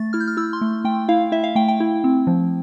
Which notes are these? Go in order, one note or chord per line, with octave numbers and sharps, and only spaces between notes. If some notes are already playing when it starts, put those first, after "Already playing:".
Already playing: A3 A6
E4 F6
G6
F6
E4 E6
C6
A3
A3 G5
E4 F5
E4 E5
F5
A3 G5
G5
E4
C4
F3